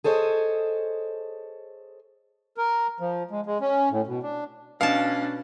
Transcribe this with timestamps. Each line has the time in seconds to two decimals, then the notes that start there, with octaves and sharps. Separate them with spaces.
0.04 G#4 A4 C5 C#5 D#5
2.57 A#4
3.00 F3
3.31 G#3
3.46 G#3
3.61 C#4
3.91 A2
4.07 B2
4.23 D4
4.81 B2 C#4 D4 F5 A5